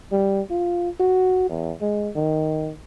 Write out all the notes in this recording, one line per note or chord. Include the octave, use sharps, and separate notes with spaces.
G3
F4
F#4
E2
G#3
D#3